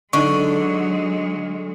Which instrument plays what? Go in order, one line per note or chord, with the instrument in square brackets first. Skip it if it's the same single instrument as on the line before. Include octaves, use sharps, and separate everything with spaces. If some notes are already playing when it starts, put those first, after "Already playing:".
[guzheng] D3 [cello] F#3 G#3 [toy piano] D#4 D#5 C#6